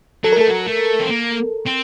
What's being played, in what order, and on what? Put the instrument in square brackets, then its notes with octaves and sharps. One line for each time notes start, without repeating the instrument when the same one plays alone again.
[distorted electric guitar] F#3 [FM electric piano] A4
[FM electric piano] A#4
[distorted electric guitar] A3 [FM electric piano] A4
[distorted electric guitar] F#3
A3
C4
A#3
C4